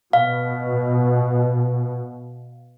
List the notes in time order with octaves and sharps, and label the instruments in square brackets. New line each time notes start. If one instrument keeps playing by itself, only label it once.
[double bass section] B2 [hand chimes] F5